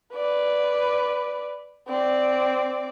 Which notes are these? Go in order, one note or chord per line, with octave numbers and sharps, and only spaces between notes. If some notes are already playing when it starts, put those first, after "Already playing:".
B4 D5
C4 D5